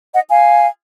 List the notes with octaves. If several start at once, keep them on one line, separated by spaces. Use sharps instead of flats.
D#5 F#5
F5 G#5